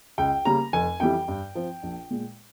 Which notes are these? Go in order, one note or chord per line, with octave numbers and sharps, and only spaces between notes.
C#2 G5
C#3 G3 A#3 A#5
F1 G#5
F2 E3 G3 G5
G2
F3 C4
A#1
A#2 G#3